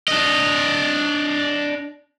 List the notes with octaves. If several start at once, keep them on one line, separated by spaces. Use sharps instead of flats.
D4 D#5